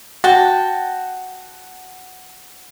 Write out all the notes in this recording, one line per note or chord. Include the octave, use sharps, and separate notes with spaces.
F#4 G5 A5